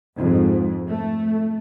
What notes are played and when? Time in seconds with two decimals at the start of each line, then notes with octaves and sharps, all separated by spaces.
0.16 F2 G#2
0.89 A3